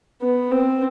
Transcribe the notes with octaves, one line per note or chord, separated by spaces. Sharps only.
B3
C4